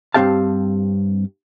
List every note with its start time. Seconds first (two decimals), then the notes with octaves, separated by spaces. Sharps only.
0.14 G2 G#3 C4 G4 F5 A5